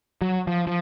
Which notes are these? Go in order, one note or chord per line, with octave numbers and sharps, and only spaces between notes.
F#3
F3
F3